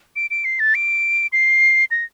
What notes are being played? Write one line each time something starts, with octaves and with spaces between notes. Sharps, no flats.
D7
D7
C7
A6
D7
C7
A#6